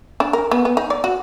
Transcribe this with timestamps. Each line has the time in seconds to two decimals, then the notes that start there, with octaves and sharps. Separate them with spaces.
0.20 D4
0.33 A#4
0.51 B3
0.65 B3
0.77 D#4
0.90 D5
1.04 F#4